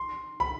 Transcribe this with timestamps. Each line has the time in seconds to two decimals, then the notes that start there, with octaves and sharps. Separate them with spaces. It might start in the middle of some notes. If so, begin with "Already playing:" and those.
Already playing: C6
0.40 B5